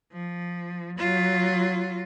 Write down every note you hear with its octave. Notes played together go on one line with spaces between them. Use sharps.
F3
F#3 F4